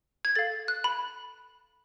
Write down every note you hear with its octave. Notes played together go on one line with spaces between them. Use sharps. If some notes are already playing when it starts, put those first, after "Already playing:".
G#6
A4 F5 A6
F#6
B5